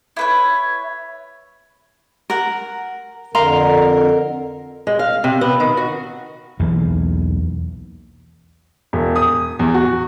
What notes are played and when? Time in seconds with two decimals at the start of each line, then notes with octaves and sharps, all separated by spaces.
0.17 E4 B4 C#5
2.30 A#4 F#5
3.35 F2 D3 A#4 F5 A#5 C6
4.87 G#3
4.99 F5
5.24 C3
5.41 B3
5.60 D#3
5.77 F#4
6.59 B1 E2 E3 A#3
8.93 E1
9.16 D#6
9.59 E2
9.74 F#4